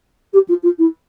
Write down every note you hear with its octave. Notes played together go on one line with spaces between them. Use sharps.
G4
F4
F4
E4